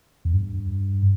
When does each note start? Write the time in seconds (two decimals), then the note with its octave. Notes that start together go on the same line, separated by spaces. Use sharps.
0.25 E2
0.33 G2